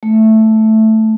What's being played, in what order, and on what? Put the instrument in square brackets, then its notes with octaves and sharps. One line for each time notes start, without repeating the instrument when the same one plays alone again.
[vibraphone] A3